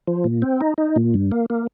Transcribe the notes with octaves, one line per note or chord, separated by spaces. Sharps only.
F3
A#2
C4
D#4
D#4
A#2
G2
A#3
A#3